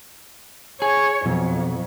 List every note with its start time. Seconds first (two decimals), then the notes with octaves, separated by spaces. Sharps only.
0.82 G#4 C#5
1.26 F2 B2 F#3